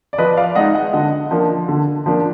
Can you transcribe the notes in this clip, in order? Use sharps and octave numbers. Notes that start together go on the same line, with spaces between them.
D5
F3 B4 D#5
D5 F5
G#3 D#4 D#5 F#5
D#5 F#5
D3 D#5 F#5
F3 A#3 D4
D3
F3 A#3 D4